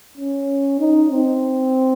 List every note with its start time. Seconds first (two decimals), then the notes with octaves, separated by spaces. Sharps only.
0.17 C#4
0.80 D#4
1.11 C4